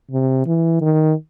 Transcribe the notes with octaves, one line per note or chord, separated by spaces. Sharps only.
C3
E3
D#3